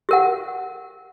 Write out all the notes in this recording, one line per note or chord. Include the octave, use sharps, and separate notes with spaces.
G4 A#4 F#5